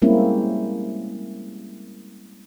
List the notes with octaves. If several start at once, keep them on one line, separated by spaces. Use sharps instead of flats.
G3 G#3 A#3 C4 C#4 E4